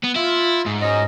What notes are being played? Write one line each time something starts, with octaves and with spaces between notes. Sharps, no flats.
B3
E4 F4
G#2
F#3 C#4 D#5